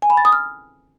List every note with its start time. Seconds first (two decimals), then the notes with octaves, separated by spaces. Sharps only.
0.02 G#5
0.10 B5
0.17 A6
0.25 D#6
0.32 F6